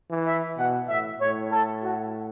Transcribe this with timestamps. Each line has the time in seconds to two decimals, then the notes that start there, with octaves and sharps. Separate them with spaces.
0.10 E3
0.26 E5
0.57 B2 F#5
0.89 A2 E5
1.21 A2 C#5
1.52 A4
1.83 F#4